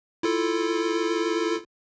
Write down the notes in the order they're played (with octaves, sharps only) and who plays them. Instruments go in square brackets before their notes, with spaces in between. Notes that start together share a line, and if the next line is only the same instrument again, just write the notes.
[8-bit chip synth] E4 F4 A4